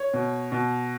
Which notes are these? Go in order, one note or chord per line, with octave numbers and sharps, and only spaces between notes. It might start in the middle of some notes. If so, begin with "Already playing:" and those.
Already playing: C#5
B2
B2